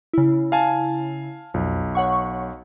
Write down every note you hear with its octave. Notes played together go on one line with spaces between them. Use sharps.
C#3 E4
F5 G#5 A5
B1 F2
C#5 F#5 C#6